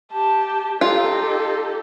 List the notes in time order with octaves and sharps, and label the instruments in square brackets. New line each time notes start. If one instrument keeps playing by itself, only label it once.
[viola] G4 [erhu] A5
[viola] D#4 A4 [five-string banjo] F4 [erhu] G4